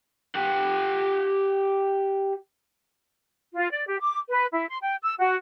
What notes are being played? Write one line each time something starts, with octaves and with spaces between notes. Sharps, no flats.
G4 F#5
F4
D5
G4
D6
B4
E4
C6
G5
E6
F#4